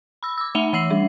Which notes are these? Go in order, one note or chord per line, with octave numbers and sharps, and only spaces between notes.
B5 E6
D6 E6
A3 E5 F#5 B5 F7 G7
E3 F#5 E6 C7 F#7
G3 D4